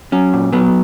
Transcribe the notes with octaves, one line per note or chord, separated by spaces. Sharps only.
F#3 C#4
A#2
F#3 B3